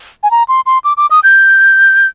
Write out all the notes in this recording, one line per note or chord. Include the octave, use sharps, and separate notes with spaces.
G#5
A#5
C6
C6
D6
D6
D#6
G6